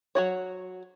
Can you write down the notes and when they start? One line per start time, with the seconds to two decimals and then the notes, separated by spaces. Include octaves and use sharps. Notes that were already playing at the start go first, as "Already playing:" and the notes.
0.15 F#3 F#4 C#5